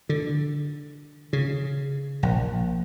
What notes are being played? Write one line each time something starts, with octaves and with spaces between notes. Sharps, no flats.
D3
C#3
A#1